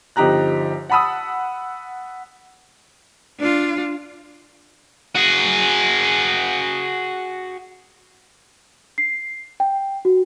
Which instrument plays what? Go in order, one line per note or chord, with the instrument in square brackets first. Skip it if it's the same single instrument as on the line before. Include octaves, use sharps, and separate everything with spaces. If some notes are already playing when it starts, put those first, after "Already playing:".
[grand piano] G1 F3 D#4 G4 A#5 F#6
F#5 A5 B5 D#6 E6
[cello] D4 F4
[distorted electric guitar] F#4 G#4
[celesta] C7
G5
F#4